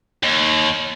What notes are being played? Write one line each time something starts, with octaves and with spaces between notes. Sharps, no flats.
D#2